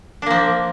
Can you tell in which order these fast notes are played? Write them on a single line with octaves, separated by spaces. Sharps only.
D4 A#3 F3